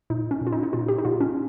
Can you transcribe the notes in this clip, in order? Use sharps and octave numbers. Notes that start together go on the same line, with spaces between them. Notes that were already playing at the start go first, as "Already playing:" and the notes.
A#2 D#4
C#4
A#2
F4
D#4
D#4
A#2 F4
G4
D#4
A#2 F4
C#4